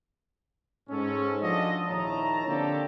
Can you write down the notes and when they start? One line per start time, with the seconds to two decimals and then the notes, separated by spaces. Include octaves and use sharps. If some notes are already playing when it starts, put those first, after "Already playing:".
0.90 G#2 C#4 A4
1.42 F3 D4 F4 F#4 A4 D#5
1.88 A#1 D#3 E4 C#5 A5 A#5
2.48 D3 A#3 C4 D4 G4 A4